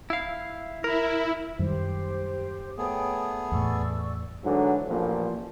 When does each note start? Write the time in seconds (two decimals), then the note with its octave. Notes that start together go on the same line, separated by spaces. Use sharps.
0.10 E4 F5
0.84 E4 A#4
1.59 F#2 D#3 G3 G4 C5
2.78 A3 B3 G#4 C#5 G5 D#6
3.52 E2 A2 D5 C#6 E6
4.44 G#2 D3 E3 F#3
4.88 A1 A#2 F3